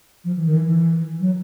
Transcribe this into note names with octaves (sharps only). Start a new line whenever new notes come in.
F3
E3
D#3
E3
F#3